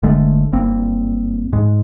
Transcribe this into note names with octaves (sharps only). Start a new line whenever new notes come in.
G1 D3 G#3 A3
F#1 G2 A#3 C4
G#2 G#3